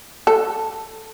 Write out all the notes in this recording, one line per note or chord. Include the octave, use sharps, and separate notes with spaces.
A4